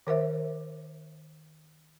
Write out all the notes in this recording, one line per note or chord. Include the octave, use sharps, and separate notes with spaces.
D#3 A#4 C5 E5